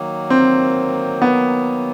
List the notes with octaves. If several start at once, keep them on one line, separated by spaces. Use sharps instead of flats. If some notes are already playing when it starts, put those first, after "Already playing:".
Already playing: D#3 F#3 A#3
C4
B3